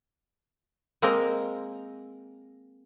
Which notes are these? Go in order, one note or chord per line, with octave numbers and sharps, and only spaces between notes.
G#3 A#3 C4 A#4